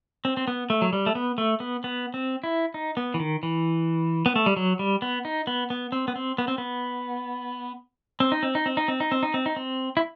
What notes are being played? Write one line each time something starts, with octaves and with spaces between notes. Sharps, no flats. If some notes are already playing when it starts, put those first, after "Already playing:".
C4
C4
B3
A3
F#3
G3
A3
B3
A3
B3
B3
C4
E4
D#4
B3
E3
D#3
E3
B3
A3
G3
F#3
G3
B3
D#4
B3
B3
C4
B3
C4
B3
C4
B3
C4
D#4
C4
D#4
C4
D#4
C4
D#4
C4
D#4
C4
D#4
C4
E4